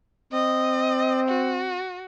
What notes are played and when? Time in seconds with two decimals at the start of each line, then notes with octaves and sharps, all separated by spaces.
0.33 C4 D#5
1.28 F#4